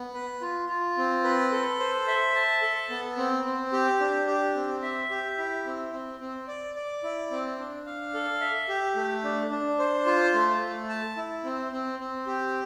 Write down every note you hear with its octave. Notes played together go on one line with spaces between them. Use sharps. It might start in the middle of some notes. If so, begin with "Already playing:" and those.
Already playing: B3
B4
F4
F4
C4
B4
A4
C5
E5
A5
A4
B3
C4
C4
G4
D4
G4
C4
E5
G4
E4
C4
C4
C4
D5
D5
E4
C4
D4
F5
A4
E5
G4
A3
D4
D4
C5
F4
A3
A3
A5
E4
C4
C4
C4
G4